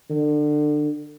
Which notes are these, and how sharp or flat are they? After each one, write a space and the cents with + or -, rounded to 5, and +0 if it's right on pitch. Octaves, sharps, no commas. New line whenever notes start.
D3 +25